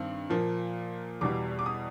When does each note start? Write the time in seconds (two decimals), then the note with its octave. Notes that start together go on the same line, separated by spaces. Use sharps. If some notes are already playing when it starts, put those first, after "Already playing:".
Already playing: G2 D#3 C4
0.30 A#2 F3 A#3
1.21 E2 B2 G3 D6
1.59 D6
1.66 D#6